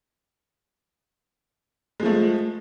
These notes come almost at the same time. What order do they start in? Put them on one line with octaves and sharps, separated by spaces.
G#3 F3 A3